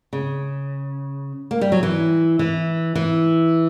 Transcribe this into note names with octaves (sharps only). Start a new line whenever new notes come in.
C#3
A#3
G3
F#3
E3
E3
E3